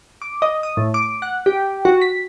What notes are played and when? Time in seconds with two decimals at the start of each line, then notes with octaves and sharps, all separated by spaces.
0.22 D6
0.42 D#5
0.63 D#6
0.77 A2
0.94 D6
1.22 F#5
1.46 G4
1.85 F#4
2.02 B6